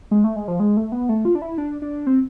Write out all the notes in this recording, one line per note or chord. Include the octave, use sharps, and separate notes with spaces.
G#3
A3
G#3
F3
G#3
A3
B3
A3
F4
D4
E4
D4
D4
C4